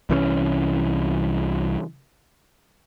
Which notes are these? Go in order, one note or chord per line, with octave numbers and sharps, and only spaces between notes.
C2 E3 G3 C#4